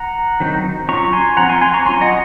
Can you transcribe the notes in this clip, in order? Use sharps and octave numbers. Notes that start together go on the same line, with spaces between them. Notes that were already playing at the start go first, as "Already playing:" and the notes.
Already playing: F#5 A#5
D#3 F#3 C4 D#4
F#3 C#4 F4 A#5 C#6
G#5 C6
F3 C4 F4 F#5 A#5
G#5 C6
G#5 C6
A#5 C#6
F#3 C#4 F4 G#5 C6
D#5 F#5